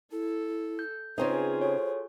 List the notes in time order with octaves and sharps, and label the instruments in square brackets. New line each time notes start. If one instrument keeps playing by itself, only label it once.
[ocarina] E4 [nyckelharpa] A4
[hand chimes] G6
[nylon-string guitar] C#3 C4 D#4 [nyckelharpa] F4 G#4 [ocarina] B4
[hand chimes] F#4 A4 C#5 [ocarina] C5